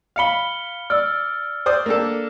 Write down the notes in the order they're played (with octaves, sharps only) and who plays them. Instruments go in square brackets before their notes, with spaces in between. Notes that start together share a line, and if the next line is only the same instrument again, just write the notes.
[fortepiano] F5 B5 [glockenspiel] F6 C#7 G7
[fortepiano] D5 [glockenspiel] E6 F6
[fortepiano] C5 D5 D#6
A#3 D4 A4